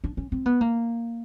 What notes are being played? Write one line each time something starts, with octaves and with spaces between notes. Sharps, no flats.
D4
C#4
C4
B3
A#3